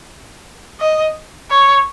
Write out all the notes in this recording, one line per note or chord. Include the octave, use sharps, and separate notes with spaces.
D#5
C#5